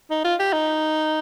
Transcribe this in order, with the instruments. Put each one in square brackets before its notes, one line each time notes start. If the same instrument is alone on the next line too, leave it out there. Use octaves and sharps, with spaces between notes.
[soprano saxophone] D#4
F4
G4
D#4